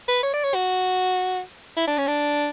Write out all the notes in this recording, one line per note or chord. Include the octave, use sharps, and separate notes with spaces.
B4
C#5
D5
C#5
F#4
E4
D4
C#4
D4